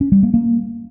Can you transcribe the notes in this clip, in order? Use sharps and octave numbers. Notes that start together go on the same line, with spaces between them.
C#4
G3
A#3
A#3